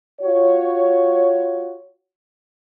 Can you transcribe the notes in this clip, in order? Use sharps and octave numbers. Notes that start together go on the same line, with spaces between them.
F4 F#4 C#5